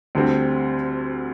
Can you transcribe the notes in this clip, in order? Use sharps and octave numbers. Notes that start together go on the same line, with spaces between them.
D2 D3 G3 C4